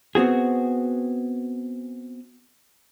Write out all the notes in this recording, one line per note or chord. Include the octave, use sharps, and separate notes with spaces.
B3 C4 F#4 G#4